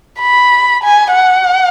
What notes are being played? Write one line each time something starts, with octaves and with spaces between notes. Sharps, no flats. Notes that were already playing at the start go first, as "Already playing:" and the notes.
B5
G#5
F#5